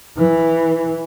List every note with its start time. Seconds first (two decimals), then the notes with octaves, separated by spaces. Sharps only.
0.18 E3